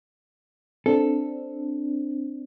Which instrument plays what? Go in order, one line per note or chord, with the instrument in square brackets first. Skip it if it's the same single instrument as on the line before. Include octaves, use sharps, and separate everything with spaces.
[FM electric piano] C4 D4 [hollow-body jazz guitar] A4